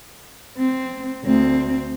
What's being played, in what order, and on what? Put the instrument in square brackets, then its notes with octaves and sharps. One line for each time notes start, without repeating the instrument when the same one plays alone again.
[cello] C4
D2 C4